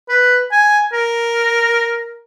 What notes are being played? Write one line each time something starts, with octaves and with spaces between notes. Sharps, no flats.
B4
G#5
A#4